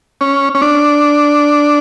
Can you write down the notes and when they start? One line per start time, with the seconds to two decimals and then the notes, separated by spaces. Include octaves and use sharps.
0.21 C#4
0.55 C#4
0.62 D4